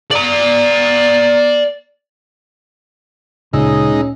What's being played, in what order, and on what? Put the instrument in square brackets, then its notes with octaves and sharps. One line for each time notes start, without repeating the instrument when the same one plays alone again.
[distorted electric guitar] D5 A#5
[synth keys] D2 A#2 E6 [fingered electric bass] C#3 [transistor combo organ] G#3 D#4 [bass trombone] C#4